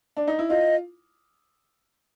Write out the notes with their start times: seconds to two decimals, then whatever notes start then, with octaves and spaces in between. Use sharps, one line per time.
0.17 D4
0.27 D#4
0.39 E4
0.49 F4 D#5